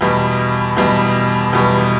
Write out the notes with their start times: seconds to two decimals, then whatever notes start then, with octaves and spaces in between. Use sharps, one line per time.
0.01 E2 B2 G3
0.77 E2 B2 G3
1.53 E2 B2 G3